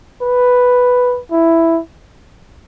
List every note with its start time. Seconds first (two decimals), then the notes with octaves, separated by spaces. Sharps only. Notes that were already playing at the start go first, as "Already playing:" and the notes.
0.22 B4
1.32 E4